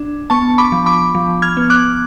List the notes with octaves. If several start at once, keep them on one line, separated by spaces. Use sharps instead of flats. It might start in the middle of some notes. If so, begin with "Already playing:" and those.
Already playing: D4
B3 A5 C#6
B5 D6
F3
B5 D6
F3
F6 G#6
B3
D6 F#6